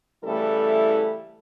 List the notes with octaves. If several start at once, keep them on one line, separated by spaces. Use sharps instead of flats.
C#3 E3 G3 A3 E4 A4